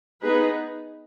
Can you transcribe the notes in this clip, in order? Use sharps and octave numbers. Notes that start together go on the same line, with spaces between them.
B3 D#4 G#4 B4